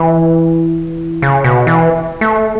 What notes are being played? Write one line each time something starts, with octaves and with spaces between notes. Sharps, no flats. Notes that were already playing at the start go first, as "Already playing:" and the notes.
Already playing: E3
C#3
B2
E3
A3